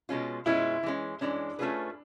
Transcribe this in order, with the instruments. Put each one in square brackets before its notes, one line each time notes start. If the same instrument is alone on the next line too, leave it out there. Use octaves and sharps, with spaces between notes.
[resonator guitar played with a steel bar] B2 G#3 C#4 F4
[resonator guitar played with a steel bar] B2 G#3 C#4 F4 [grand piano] E4
[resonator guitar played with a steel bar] E3 G#3 C#4
[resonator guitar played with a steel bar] E3 G#3 C#4 [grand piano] D4
[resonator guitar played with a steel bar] A3 C#4 F4 G#4 B4